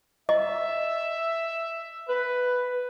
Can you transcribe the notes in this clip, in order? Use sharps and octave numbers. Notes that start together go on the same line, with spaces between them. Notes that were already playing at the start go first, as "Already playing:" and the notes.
D#5 E5
B4